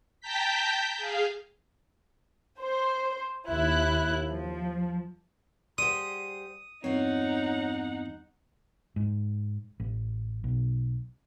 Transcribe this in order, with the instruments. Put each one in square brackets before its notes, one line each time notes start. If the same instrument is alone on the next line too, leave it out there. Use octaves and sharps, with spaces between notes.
[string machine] G5 A5 A#5 G6 B6
G#4 F5
[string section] C5
D#2 E4 F#6
F3
[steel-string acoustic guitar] G3 G#4 C5 [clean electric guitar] F#5 C6 [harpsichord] D#6
[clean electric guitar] E2 G2 C4 [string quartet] D#4 F#5 [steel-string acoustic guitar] F4 C#5
[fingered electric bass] G#2
A1
B1